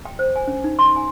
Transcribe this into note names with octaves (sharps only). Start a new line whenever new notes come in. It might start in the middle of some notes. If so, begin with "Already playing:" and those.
G5
C5
G#5
C#4
D#4
C6
G#5